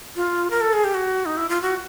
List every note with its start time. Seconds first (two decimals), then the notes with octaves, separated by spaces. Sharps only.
0.16 F4
0.50 A#4
0.61 A4
0.73 G#4
0.84 G4
0.94 F#4
1.26 D#4
1.37 E4
1.49 F4
1.62 F#4